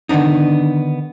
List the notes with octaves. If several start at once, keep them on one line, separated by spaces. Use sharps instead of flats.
D3 D#3 B3 D4 D#4